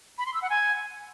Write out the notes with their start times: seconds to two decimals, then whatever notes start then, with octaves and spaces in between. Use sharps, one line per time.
0.18 B5
0.26 C6
0.34 E6
0.42 F#5
0.50 G#5